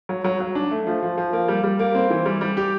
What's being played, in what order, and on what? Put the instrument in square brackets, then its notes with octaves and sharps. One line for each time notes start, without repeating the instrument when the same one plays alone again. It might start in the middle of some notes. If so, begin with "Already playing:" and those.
[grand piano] F#3
F#3
F#3
D4
A3
F3
F3
F3
A#3
G3
G3
A#3
C4
E3
G3
G3
G4